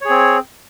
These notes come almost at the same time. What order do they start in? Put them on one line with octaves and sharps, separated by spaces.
C#5 G#4 C4